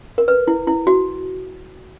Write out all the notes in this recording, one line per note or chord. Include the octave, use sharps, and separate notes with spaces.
A#4
B4
E4
E4
F#4